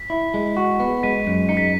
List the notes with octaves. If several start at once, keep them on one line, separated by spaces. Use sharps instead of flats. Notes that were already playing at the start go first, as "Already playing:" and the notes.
Already playing: B6
E4
G#3
F#4
B3
G#3 B6 D#7
F#2
D#4 C#7
B6